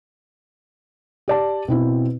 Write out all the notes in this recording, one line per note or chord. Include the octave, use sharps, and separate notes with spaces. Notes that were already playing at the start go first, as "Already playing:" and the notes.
G4 D5 A5
B2 C4 E4